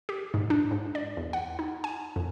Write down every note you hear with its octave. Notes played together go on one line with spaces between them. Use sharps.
G4
G#2
D4
G#2
D5
E2
F#5
D#4
G#5
F2